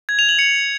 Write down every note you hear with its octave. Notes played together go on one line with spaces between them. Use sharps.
G#6
F7
F#7
C#7